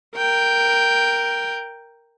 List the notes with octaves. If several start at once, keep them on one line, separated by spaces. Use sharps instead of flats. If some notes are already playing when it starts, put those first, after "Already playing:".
A#4 G5